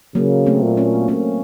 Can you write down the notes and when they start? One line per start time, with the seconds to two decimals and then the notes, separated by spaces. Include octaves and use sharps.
0.15 C#3 F#3 A#3
0.46 A3 C4
0.62 A#2
0.77 A#3 C#4
1.08 A#3 C#4